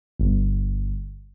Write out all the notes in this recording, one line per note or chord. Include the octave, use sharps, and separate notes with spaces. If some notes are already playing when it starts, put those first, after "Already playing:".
G1